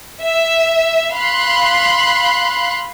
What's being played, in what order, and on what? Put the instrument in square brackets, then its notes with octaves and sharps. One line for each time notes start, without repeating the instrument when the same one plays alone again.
[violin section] E5
F5 B5 C6 F#6